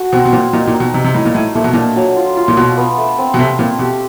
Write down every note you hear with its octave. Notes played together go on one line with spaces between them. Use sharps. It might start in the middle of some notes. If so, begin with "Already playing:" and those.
Already playing: F#4 A4
B2 C4
B2
A#2 C4
A#2 D#4
A#2
D#4
B2
C3 D#4
C3
A2 D#4
A#2
A2 A3
A#2 A3
B2
A#2 D4
F#3
F4
F4
A#2
B2 F4
B3
A3
C4
B2
C3 A3
A#2 C4
B2 G4